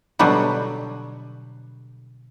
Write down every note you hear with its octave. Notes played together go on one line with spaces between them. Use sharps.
B2 D3 F#3 G3 B3